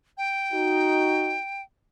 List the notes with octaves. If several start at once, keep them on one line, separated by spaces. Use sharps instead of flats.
G5
D#4 F#4